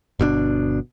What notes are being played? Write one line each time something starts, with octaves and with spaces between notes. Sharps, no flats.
G1 B2 D3 D4